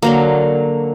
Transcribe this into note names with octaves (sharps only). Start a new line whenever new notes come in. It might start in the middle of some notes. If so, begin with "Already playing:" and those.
D3 F#3 A#3